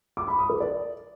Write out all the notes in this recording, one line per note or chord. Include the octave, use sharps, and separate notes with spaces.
D6
B5
D#6
B4
D5